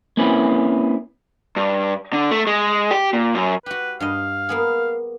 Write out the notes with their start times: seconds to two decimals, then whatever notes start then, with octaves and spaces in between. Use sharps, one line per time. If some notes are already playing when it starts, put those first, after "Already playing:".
0.17 A#3 C4 C#4 E4 B4
1.57 G2
2.13 D3
2.31 A3
2.47 G#3
2.91 G4
3.13 A#2
3.35 F#2
3.66 F#4 G4 B4
4.00 G2 D#5 F5
4.49 A#3 B3 G#4